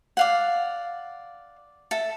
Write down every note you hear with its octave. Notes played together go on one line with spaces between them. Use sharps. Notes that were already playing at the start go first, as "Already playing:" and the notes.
D5 F5 F#5
A4 E5